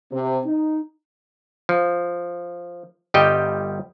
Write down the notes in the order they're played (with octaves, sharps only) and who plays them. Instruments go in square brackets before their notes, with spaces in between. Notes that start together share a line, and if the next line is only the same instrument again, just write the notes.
[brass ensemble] C3
D#4
[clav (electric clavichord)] F3
G1 G3 G4 D#5 G5